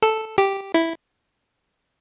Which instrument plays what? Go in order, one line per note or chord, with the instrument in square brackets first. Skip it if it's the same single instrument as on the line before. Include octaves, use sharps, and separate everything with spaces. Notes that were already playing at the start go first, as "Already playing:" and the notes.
[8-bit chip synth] A4
G4
E4